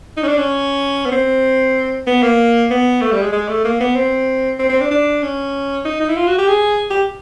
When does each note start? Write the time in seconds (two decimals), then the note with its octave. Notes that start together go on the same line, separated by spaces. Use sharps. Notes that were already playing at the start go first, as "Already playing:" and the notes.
0.17 D#4
0.23 C#4
0.27 D4
0.38 C#4
1.06 B3
1.12 C4
2.07 B3
2.23 A#3
2.70 B3
3.02 A3
3.12 G3
3.22 G#3
3.32 G#3
3.49 A3
3.65 A#3
3.80 B3
3.95 C4
4.59 C4
4.70 C4
4.81 D4
4.91 D4
5.23 C#4
5.85 D#4
6.00 D#4
6.09 E4
6.17 F4
6.28 F#4
6.39 G4
6.48 G#4
6.90 G4